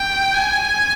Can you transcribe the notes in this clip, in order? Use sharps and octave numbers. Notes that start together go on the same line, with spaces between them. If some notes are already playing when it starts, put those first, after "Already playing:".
Already playing: G5
G#5